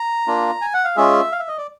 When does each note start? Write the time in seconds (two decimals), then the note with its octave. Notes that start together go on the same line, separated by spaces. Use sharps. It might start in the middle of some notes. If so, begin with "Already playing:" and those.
Already playing: A#5
0.27 A#3 D4 F4
0.61 G#5
0.74 F#5
0.84 F5
0.96 G#3 C#4 F4 G#4 E5
1.32 F5
1.40 E5
1.48 D#5
1.58 D5